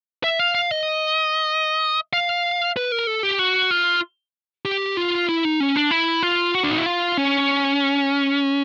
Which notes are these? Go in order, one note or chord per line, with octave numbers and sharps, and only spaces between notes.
E5
F5
F5
D#5
F5
B4
A#4
A4
G4
F#4
F4
G4
F4
E4
D#4
C#4
D4
E4
F4
F#4
D4
D#4
E4
F4
C#4